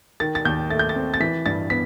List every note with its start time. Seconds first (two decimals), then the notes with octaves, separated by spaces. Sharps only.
0.20 D#3 A6
0.35 A6
0.45 D#2 G6
0.70 A3 A6
0.79 G6
0.89 A6
0.95 C4
1.14 A6
1.20 E3 B6
1.46 G2 A6
1.70 B3 B6